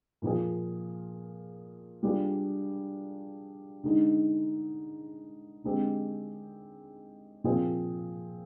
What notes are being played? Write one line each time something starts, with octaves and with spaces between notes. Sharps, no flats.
A#2 F3 A#3 F4 G#4
G3 D4 F4 G#4
D3 G#3 D#4
D3 G#3 C4 G4
A#2 F3 C4 F4 G#4